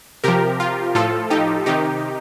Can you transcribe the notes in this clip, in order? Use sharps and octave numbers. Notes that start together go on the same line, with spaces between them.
C3 F3 G4 A#4
F4
A2 F3 F4 A4
D#4 G4
C3 D#3 D#4 G4